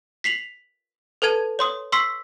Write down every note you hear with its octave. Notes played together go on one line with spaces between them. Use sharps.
B6 C7 F7 F#7
A4 B4 A5 G#6 D#7
C#5 C6 D#6
C6 C#6 E6 B6 C7